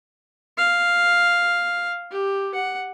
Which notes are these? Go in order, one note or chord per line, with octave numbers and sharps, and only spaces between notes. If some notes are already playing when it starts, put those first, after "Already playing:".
F5
G4
F#5